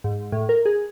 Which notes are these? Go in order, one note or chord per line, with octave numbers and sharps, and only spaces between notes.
G#2
A2
A#4
G#4